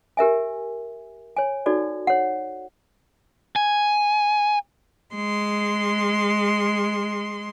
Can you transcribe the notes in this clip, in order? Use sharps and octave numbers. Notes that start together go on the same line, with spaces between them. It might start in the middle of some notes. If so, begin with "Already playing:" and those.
G4 A#4 E5 G#5
C#5 G#5
D#4 F#4 A4 D5
C#5 F#5
G#5
G#3 C6